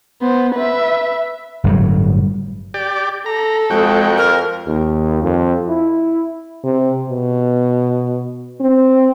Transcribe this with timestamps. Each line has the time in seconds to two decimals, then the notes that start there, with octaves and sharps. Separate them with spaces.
0.22 B3 C5
0.55 B4 E5
1.64 G1 A2 F#3 G3
2.74 G4 D5
3.26 A4 A#5
3.71 F2 G#3 F#4 G5
4.17 A#4
4.67 D#2
5.23 F2
5.69 E4
6.64 C3
7.10 B2
8.61 C4